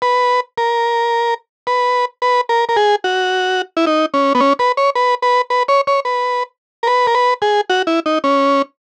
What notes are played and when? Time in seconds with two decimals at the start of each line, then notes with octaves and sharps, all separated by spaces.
0.02 B4
0.58 A#4
1.67 B4
2.22 B4
2.49 A#4
2.69 A#4
2.76 G#4
3.04 F#4
3.77 E4
3.87 D#4
4.14 C#4
4.35 B3
4.40 C#4
4.59 B4
4.77 C#5
4.95 B4
5.22 B4
5.50 B4
5.68 C#5
5.87 C#5
6.05 B4
6.83 A#4
6.87 B4
7.07 A#4
7.15 B4
7.42 G#4
7.70 F#4
7.87 E4
8.06 D#4
8.24 C#4